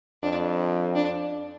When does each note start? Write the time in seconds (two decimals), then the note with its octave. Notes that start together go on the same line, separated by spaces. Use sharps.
0.23 F2 D4
0.95 D4